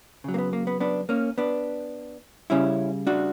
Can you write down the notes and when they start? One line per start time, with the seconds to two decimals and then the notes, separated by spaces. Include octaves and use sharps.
0.24 C#3 F#3
0.34 A#3
0.38 B3
0.53 A#3
0.67 B3
0.80 B3 D4
1.09 A#3 C#4
1.38 B3 D4
2.50 C#3 G3 C#4 E4
3.07 D4 F#4